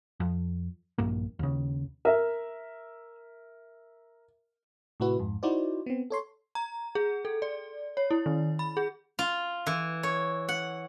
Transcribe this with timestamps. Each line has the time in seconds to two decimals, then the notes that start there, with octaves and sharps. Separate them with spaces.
0.20 F2
0.98 A#1 G2 A#3
1.39 D#2 C#3
2.05 A#4 E5
5.00 A2 C3 E4 F#4 B4
5.19 F2 G#2
5.43 D#4 E4 F#4 C5 D5
5.86 B3 C4
6.10 A4 C#5 C6
6.55 A#5
6.95 G#4
7.25 A4
7.42 D5
7.97 C#5
8.11 E4
8.26 D#3
8.59 B5
8.77 G#4
9.19 F4
9.67 E3
10.03 C#5
10.49 F#5